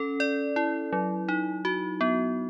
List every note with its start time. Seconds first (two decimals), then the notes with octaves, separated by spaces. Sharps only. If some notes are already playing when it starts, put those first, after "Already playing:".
Already playing: C#4 A4
0.20 D5
0.56 E4
0.93 F#3
1.29 D#4
1.65 F#4
2.01 B3